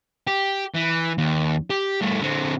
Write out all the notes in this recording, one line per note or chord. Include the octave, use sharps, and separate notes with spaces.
G4
E3
D#2
G4
G2 A3
D3 C4